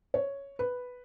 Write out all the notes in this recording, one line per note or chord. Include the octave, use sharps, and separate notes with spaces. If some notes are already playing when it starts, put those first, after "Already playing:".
C#5
B4